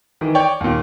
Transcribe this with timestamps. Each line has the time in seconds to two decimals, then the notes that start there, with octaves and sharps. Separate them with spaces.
0.21 D#3 E3
0.35 C#5 D5 G5 C#6
0.60 D#2 A#2